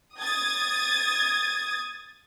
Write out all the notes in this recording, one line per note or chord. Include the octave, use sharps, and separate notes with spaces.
D#6 G#6 A6